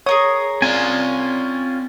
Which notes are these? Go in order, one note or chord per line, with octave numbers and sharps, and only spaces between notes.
G#4 A#4 C#5 D#6
C4 C#4 F4 D5 G#5